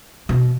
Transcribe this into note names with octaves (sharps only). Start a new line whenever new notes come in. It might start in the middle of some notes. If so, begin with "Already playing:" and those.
B2